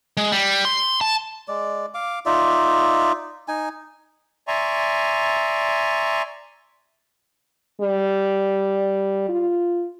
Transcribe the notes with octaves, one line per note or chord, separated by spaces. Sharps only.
G#3
G3
C6
A5
G#3 D5
F5 D6
D#4 F4 D5 E5
D#4 G#5
D5 E5 G#5 A#5 C6 C#6
G3
F4